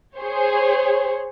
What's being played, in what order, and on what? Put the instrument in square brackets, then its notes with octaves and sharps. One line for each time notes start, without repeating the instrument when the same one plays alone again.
[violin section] G#4 C5 C#5